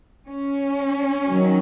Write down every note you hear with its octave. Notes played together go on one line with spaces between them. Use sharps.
C#4
D#3 F#3